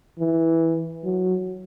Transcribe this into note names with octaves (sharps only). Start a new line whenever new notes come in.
E3
F#3